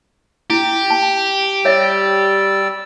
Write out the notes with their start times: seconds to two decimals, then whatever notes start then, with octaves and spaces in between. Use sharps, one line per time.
0.50 E4 G4
0.90 A5
1.65 G3 C#5 D5 E5 E6